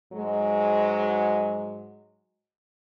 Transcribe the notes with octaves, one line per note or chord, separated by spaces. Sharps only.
G#2 F#3 G#3